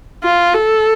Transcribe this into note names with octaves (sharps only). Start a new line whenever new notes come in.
F4
A4